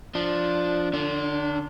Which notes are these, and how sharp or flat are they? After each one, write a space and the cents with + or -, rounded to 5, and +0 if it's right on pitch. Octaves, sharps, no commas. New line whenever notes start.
F3 +0 D4 +0
D3 +25 D4 -30